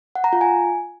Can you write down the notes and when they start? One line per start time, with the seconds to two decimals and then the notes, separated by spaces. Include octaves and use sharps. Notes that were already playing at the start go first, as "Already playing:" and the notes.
0.15 F#5
0.24 A#5
0.33 F4
0.41 G#5